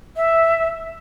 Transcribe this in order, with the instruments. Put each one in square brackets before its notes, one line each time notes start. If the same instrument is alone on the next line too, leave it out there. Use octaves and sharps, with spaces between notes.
[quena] E5